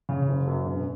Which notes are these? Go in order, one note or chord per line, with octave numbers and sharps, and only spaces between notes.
C#3
F#1
F#2
E1